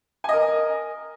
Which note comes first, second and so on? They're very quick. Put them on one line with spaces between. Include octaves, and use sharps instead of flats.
G#5 D#5 A#4